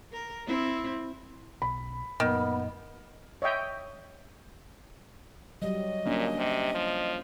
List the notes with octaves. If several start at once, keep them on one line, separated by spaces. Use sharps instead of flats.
A#4
C4 E4
B1 B5
F#2 A#2 D#3 B3
C#5 D#5 E5 G5
F#3 G3 D#5
A#2 A#3 C#4 D4
C3
F3